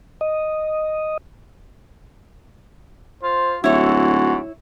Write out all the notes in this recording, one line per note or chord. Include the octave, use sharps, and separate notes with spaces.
D#5
F4 C5
D1 G#2 E4 F#4 C#5